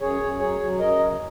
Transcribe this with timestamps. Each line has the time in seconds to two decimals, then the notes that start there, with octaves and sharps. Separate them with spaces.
0.01 F#2 G#4 C#5
0.21 F#2
0.39 F#3 G#4 C#5
0.60 F#3
0.79 F#2 A#4 D#5
0.99 C#3